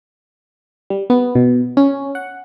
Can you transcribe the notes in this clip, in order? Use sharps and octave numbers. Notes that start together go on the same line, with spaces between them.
G3
B3
B2
C#4
F#5